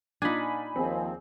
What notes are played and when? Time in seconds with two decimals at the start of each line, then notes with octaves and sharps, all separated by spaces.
0.22 A#2 D4 D#4 F4 G#5 B5
0.76 D#2 F3 C4 G#4